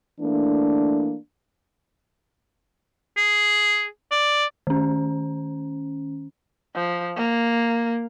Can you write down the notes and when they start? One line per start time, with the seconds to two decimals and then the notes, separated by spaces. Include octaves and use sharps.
0.20 E3 A3 A#3 D4
3.17 G#4
4.11 D5
4.67 D#3 C#4
6.75 F3
7.17 A#3